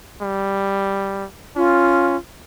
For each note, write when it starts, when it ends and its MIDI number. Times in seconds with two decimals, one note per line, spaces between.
0.22 1.25 55
1.57 2.16 61
1.57 2.16 65